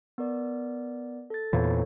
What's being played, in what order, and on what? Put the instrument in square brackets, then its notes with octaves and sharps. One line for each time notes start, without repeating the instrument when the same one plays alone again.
[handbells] B3 A#4 D5
A4 A6
[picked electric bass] E2 A#2 E3 [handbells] A4 C5 C#5